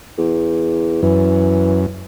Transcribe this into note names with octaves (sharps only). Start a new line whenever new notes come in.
E2
F#2 E3